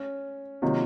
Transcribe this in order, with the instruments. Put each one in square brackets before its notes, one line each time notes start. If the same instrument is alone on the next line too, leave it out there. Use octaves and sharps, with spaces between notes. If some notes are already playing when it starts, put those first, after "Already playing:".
Already playing: [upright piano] C#4
[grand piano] C3 D#3 F#3 A#3 [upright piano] F4